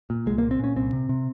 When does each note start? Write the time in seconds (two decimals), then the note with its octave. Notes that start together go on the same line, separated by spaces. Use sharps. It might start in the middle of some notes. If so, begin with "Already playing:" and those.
0.10 A#2
0.26 C2 G#3
0.38 A#3
0.43 A#2
0.51 C4
0.59 A#2 C#4
0.76 C2 C4
0.93 C3
1.09 C3